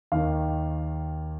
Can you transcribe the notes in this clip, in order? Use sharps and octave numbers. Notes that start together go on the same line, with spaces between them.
D#2 D#3 F5